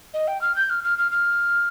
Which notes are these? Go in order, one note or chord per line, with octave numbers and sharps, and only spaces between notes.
D#5
G5
F6
G6
F6
F6
F6
F6